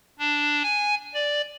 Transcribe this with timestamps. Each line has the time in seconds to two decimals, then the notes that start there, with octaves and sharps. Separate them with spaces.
0.19 D4
0.63 G#5
1.14 D5